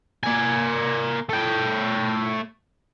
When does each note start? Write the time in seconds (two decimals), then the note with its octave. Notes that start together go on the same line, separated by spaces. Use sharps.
0.23 A#3 G#5
1.29 A3 G5